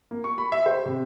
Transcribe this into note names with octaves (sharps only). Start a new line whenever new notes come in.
A#3
C#6
B5
E5
C5
C3